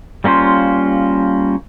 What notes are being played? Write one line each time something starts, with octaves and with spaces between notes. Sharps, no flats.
G3 A#3 C#4 F4 C5